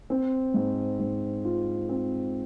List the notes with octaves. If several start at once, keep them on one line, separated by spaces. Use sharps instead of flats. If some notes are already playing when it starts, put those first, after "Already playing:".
C4
G#2
G#2
F4
C4